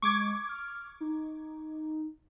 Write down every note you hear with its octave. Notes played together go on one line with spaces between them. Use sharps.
G#3 C#6 D6 G#6
F6
D#4